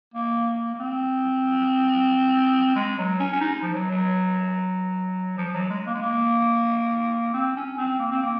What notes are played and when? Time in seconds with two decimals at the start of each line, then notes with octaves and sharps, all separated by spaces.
0.14 A#3
0.74 A#3
0.80 C4
2.76 G#3
2.98 F#3
3.20 C#4
3.33 C#4
3.41 D#4
3.62 F3
3.74 F#3
3.91 F#3
5.38 F3
5.48 F3
5.54 F#3
5.70 G#3
5.87 A#3
5.94 G#3
6.02 A#3
7.33 C4
7.56 C#4
7.78 C4
7.99 A#3
8.11 C4
8.23 A#3